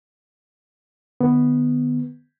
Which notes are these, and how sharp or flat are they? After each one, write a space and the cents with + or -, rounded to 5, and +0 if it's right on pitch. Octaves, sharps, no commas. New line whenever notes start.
D3 +45 B3 +0